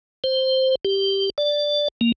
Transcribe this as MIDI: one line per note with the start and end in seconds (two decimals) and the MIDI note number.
0.24 0.75 72
0.85 1.30 67
1.38 1.88 74
2.01 2.12 58